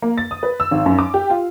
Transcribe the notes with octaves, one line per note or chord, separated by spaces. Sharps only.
A#3
A6
D#6
B4
E6
G#1
F#2
D6
G4
F4